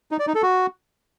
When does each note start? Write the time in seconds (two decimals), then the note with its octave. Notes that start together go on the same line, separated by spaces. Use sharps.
0.11 D#4
0.19 D5
0.27 D#4
0.35 A4
0.43 F#4